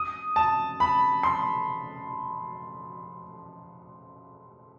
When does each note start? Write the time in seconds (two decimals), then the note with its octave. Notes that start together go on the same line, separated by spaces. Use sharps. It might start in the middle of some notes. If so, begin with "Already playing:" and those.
Already playing: D#6
0.36 A5
0.80 B5
1.23 C6